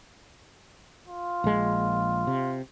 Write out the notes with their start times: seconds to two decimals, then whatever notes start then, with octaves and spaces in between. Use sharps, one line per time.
1.08 F4
1.44 A#1 G#3
2.27 C3